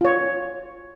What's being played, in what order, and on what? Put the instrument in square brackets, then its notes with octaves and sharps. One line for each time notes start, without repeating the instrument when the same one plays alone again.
[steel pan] F4 C#5